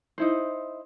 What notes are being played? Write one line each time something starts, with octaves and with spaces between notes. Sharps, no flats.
D#4 E4 C5